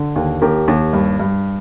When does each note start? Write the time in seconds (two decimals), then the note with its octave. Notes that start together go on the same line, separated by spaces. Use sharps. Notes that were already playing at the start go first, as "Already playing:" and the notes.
Already playing: D3
0.16 D#2
0.42 D#2 G4 A#4
0.68 D#2
0.93 G2
1.20 G2